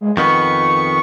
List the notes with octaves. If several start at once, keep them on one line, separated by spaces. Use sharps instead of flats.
G#3
F2 D#3 B3 C#6